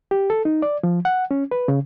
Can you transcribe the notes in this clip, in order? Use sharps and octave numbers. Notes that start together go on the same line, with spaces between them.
G4
A4
D#4
D5
F3
F#5
C#4
B4
C#3